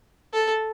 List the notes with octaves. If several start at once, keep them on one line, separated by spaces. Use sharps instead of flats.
A4